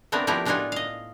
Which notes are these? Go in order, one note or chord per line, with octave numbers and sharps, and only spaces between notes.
A3 B3 C4 D4 A#4
F3 A3 B3 E4 G4 A#4
A2 D4 D#4 F4 F#4 G#5
D#5 F5